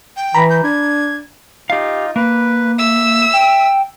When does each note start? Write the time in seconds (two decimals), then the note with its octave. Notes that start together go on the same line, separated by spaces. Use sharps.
0.16 G5
0.35 E3 A#5 B5
0.50 G6
0.64 D4 G#6
1.70 D#4 F4 G4 F5
2.16 A#3 B4
2.78 E5 E6
3.33 G5